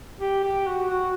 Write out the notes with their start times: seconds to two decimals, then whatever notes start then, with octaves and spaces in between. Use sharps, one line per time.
0.21 G4
0.44 G4
0.67 F#4
0.90 F#4